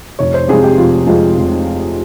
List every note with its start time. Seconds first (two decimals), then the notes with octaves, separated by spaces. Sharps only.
0.19 F1 C#5
0.34 C5
0.48 F2 C3 F3 G#3 G#4
0.63 G4
0.78 F1 F4
1.07 F2 C3 F3 G#3
1.37 F1